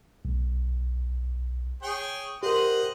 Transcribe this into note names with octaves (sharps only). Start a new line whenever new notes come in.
B1
G#4 C#5 G5
G4 A#4 C5 D#5 F#5